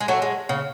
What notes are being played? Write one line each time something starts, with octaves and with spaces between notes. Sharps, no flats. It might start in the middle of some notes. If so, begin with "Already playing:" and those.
G#3
F#3 A3
G#3
C#3